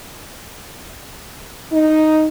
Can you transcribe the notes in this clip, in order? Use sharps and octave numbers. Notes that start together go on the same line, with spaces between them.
D#4